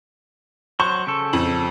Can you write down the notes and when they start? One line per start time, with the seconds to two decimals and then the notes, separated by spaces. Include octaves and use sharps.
0.80 F#3 C5 C#6
1.07 C#3 A4
1.33 F2 F#7